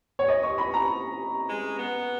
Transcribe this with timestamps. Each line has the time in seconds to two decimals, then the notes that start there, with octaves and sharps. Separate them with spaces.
0.19 C#5
0.28 D#5
0.43 C#6
0.58 B5
0.74 A#5
1.49 G#3
1.79 B3